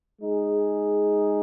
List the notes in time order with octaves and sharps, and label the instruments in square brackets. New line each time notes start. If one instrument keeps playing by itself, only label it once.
[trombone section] G#3 D#4 G#4